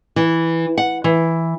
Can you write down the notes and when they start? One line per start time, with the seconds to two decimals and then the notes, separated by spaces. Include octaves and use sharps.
0.16 E3
0.78 F#5
1.04 E3